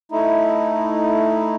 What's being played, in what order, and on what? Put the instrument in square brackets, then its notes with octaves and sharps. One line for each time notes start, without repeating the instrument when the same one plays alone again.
[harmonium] A3 D#4 E4